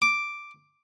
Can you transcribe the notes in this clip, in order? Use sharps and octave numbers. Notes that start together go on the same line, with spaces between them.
D6